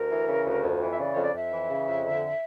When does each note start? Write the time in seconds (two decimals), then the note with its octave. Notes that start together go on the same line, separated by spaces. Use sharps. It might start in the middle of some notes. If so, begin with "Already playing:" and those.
Already playing: D2 A#4
0.10 E3
0.28 C#3
0.46 D2
0.63 F2
0.81 E3
0.92 E5
0.99 C#3 D5
1.12 F2 C#5
1.23 D5
1.34 F2 E5
1.52 E3
1.70 C#3
1.87 F2
2.05 D3